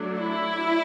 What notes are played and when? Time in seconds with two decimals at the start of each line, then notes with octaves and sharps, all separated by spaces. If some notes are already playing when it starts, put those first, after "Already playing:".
Already playing: F#3 A3 D4
0.18 E4